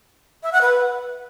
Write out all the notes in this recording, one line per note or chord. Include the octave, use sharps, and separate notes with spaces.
E5
F#5
B4